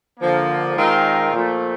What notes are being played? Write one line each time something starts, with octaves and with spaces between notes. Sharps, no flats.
D3 F3 A#3
D#3 G#3 C4 F4 A#4
A#2 F3 A3